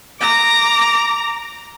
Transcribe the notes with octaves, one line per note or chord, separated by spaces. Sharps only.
A#5 D6